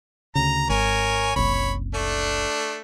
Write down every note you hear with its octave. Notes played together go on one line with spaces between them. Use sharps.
D2 C#3 A#5
G#1 A#4 C#5 G#5
F#1 C2 C#5 B5
A3 D4